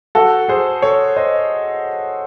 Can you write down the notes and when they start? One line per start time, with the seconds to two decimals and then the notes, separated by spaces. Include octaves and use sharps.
0.15 F#4 A4
0.48 G#4 C5
0.82 A4 C#5
1.16 C5 D#5